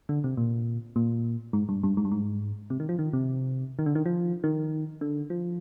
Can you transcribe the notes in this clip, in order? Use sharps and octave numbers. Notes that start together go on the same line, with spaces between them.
D3
C3
A#2
A#2
G#2
G2
G2
G#2
G2
G#2
C3
D#3
F3
D#3
C3
D#3
D3
D#3
F3
D#3
D3
F3